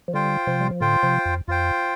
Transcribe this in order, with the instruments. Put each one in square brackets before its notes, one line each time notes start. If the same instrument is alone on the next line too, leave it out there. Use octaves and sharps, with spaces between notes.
[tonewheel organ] F3
[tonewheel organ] D3 G3 [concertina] F4 C5 G5
[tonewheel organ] C3 F3
G3
F3
[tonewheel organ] A2 D3 [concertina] F4 C5 G5
[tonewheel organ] C3 F3
F2
[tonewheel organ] F2 [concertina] F4 C5 G5